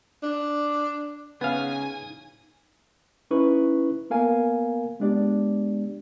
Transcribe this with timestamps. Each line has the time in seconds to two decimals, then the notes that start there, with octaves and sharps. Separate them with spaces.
0.23 D4
1.41 C#3 B3 D#4 F5 G#5
3.31 C#4 D#4 E4 B4 C#6
4.10 A#3 B3 A#4 F5 G#5
5.00 G#3 B3 D4 G4 D5